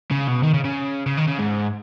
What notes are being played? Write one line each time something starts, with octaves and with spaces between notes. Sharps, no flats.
C#3
B2
D#3
C#3
C#3
C#3
D#3
C#3
G#2